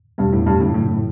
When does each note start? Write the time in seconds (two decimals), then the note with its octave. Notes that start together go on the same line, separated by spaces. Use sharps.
0.18 E2 G2 B2 G3 B3
0.32 A2
0.46 G2
0.60 F#2 A2 C#3 F#3
0.74 A2
0.88 A2